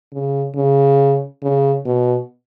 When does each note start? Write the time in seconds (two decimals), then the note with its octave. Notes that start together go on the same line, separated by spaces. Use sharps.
0.13 C#3
0.56 C#3
1.43 C#3
1.85 B2